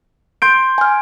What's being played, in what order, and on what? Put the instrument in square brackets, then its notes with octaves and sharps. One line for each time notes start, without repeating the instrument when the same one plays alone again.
[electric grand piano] C6 G6 D7
[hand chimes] G#5 F6